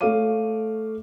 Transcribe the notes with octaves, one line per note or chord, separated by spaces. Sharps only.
A3 A4 C#5 F5 D6 D#7